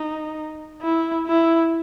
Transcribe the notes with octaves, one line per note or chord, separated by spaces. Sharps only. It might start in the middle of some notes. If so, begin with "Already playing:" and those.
Already playing: D#4
E4
E4